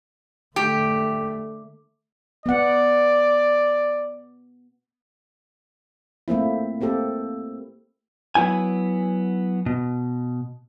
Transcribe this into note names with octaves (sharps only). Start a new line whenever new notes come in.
D3 A3 G4
B3 D5 F#5
A3 A#3 C4 E4
A#3 C4 G4 A4
F#3 B3 E4 G#5
B2